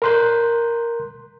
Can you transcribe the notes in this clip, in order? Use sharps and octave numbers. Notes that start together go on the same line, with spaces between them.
A#4 A#5 C6 F#6 G6